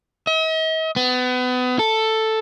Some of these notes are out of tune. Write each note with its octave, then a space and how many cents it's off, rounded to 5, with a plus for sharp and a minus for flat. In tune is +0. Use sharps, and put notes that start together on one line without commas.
D#5 +45
B3 +30
A4 +5